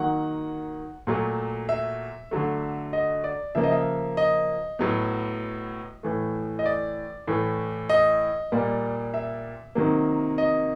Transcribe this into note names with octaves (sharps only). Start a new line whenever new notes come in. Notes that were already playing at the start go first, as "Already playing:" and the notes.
Already playing: D#3 F#3 A#3 F#5
A#2 F#3 A3
E5
D3 F#3 A3
D#5
D5
C#3 F3 A#3 E5
D#5
E5
D#5
A2 F#3 B3
A2 E3 A3
D#5
D5
A2 E3 A3
D#5
A#2 G3 A#3
E5
C3 D#3 F#3 A#3
D#5